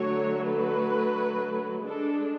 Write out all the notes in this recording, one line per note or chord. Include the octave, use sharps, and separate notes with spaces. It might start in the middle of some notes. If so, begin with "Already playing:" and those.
Already playing: D3 F#3 A3 C#5
B4
G#3 D4 A4